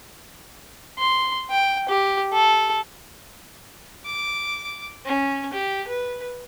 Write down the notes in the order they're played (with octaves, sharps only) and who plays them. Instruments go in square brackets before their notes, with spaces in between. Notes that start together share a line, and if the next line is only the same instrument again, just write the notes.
[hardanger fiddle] C6
G5
G4
A4
[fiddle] D6
C#4
G4
B4